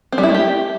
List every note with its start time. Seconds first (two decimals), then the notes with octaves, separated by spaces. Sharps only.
0.12 C4
0.18 G3
0.23 E4
0.29 A3
0.34 G4